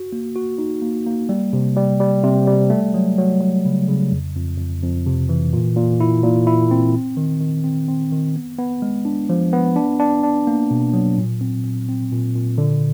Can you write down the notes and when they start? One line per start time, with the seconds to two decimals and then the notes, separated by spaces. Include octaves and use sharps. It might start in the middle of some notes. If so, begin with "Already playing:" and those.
Already playing: F#4
0.12 A#3
0.36 F#4
0.58 D#4
0.82 A#3
1.06 A#3
1.29 G3
1.53 C3
1.76 G3
2.00 G3
2.24 C3
2.47 G3
2.70 A3
2.94 F#3
3.18 F#3
3.41 F#3
3.65 C#3
3.88 C#3
4.12 F2
4.36 F2
4.58 F2
4.82 F2
5.06 C3
5.29 E3
5.53 A#2
5.76 A#2
6.00 E4
6.24 A#2
6.47 E4
6.71 C4
6.95 C4
7.17 D#3
7.40 D#3
7.64 C4
7.88 C4
8.12 D#3
8.36 B3
8.58 B3
8.82 G#3
9.05 D4
9.29 F3
9.53 B3
9.76 D4
9.99 D4
10.23 D4
10.47 A#3
10.71 B2
10.94 F#3
11.18 A#2
11.41 C4
11.64 A#2
11.88 C4
12.12 A#2
12.35 A#2
12.58 D3